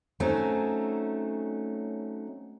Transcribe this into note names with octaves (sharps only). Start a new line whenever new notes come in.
F#3 A3 C4 C#4 D#4